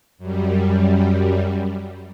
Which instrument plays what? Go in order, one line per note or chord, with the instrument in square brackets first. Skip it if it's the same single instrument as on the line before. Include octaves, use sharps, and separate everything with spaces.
[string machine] F#2 G3